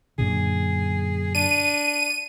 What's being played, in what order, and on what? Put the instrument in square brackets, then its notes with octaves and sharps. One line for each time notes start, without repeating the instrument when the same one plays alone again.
[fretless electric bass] F#2 A#2 D3 [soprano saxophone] G#4
[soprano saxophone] D4 [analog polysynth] D#7